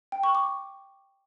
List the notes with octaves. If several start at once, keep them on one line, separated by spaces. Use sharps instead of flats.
G5
C#6
D6